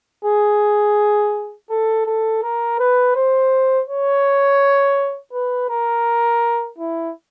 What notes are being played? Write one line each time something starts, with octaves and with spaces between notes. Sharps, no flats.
G#4
A4
A4
A#4
B4
C5
C#5
B4
A#4
E4